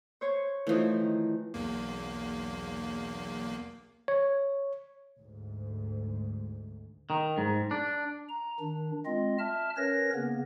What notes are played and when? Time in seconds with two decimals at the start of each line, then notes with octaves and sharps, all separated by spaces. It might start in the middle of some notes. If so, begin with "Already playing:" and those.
0.21 C5 C#5 C#6
0.67 E3 F3 A3 D#4
1.00 D#3
1.54 B1 E2 A#3
4.08 C#5
5.19 D2 G#2
7.10 D#3
7.38 G#2
7.71 D4
8.29 A#5
8.60 D#3 D4
9.06 G#3 C4 F4 D#5
9.39 E5 A5 F6
9.77 C#4 A#4 B4 C#5 A#6
10.14 C#3 A#3 B3